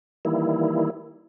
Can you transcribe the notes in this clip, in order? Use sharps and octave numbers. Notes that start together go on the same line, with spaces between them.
D#3 E3 G3 A#3 E4